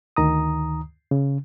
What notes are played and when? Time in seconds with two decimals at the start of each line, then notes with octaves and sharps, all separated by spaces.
0.17 D2 D#3 A#5 D#6
1.11 C#3